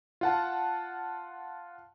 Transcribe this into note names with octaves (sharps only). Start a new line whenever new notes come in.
F4 F#5 A5